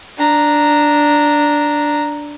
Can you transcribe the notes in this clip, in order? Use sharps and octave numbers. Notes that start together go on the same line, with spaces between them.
D4 A#5